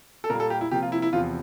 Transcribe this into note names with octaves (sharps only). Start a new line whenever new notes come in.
A4
A#2 G3 A#3 A#4
A4
G4
E4
C3 F3 A#3 G4
F4
E4
E4
E2 C3 F3 F4